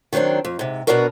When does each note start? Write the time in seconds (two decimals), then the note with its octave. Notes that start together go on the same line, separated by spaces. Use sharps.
0.13 D#3 F#3 B3 C4 D4
0.45 F2
0.59 G#2 C3
0.87 B2 A#3 B3 D4 F#4 A#4